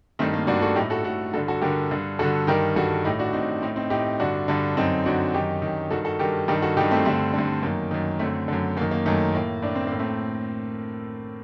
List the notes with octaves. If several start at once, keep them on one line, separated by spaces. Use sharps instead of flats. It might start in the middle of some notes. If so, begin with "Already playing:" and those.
G2 D#3 A3 C4
A#3
G2 D#3 D4 F#4
F#4 A4
A2 D#4 G4
F#4 A4
A2 F#4 A4
G2 D3 F#4 A4
F#4 A4
G2 D3 G4 A#4
G2 D3
G2 D3 F#4 A4
G2 D#3 G4 A#4
G2 D#3 F#4 A4
A2 D#4 G4
D4 F#4
A2 C4 D#4
A2 C4 D#4
C4 D#4
A2 D#4 G4
G2 D3 D4 F#4
G2 D3
F#2 D3 C4 D#4
F#2 D3 D4 F#4
F#2 D#3 D#4 G4
F#2 D#3
G2 D#3 F#4 A4
F#4 A4
G2 D#3 G4 A#4
G2 D#3 G4 A#4
F#4 A4
G2 D#3 D#4 G4
A3 C4
G2 D3 A3 C4
G2 D3
F#2 D#3 A#3
F#2 D#3
F#2 D3 A3 C4
F#2 D3
F#2 D#3 A#3
A#3
F#2 D#3 A3
A2 A#3
A2 D4
C4
A2 A#3
A3 C4